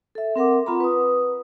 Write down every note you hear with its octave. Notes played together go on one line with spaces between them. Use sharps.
A4 E5
C4 A#4 F#5 D6
C4 F4 F#5 A#5 B5
B4 D#6